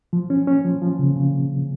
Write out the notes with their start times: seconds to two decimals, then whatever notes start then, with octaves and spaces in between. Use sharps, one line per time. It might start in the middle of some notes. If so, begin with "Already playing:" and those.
0.13 F3
0.30 C#4
0.47 C#4
0.64 F3
0.82 F3
0.99 C#3
1.16 C#3